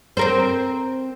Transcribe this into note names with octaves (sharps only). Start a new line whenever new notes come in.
C4 A#4 C5